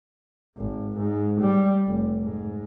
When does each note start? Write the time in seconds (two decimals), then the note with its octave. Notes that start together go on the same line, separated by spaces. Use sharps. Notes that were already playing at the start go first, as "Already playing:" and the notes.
0.57 G#1
0.97 G#2
1.40 G3
1.87 F1
2.22 G#2